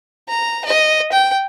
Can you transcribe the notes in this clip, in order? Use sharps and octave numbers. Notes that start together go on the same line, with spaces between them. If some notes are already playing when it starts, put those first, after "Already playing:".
A#5
D#5
G5